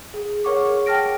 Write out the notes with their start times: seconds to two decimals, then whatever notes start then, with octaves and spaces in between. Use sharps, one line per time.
0.14 G#4
0.44 G#4 A#4 C#5 F#5 C#6 D6
0.86 G5 A5 F6 A#6 D7